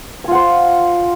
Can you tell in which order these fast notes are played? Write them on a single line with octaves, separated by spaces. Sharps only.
G#5 F4 F#5 C5